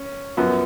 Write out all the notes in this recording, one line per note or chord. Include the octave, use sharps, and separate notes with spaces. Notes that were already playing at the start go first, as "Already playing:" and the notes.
Already playing: C#4
F#2 F3 B3